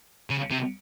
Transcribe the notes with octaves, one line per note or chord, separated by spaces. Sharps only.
C#3
C3